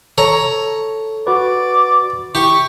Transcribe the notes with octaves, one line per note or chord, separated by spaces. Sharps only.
A4 C#5 A#5
F#4 B4 D5
E4 G4 C#6